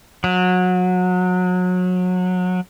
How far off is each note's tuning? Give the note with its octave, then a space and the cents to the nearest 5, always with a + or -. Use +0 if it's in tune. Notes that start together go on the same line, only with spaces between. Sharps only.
F#3 -25